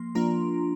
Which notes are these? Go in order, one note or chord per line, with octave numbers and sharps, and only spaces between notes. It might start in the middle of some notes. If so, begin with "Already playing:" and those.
Already playing: F3 A#3 C6
F3 A#3 D4 F4 A#5